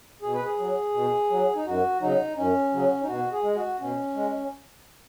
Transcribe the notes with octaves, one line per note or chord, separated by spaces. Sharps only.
B2 G#4
B4
G#4
F#3
B2
F#3
D#4
F#2 F#4
C#3 F#3 D#4
F#2 C#4
C#3 F#3
D#4
B2 F#4
G#4
G#3
F#4
B2 C#4
G#3